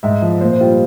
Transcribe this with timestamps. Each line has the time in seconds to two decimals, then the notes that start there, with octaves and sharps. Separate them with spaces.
0.03 G#2 E5
0.22 F3
0.41 A#2 C5
0.61 G3 F4